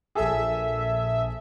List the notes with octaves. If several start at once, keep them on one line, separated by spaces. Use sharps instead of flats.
A#1 G#4 A4 E5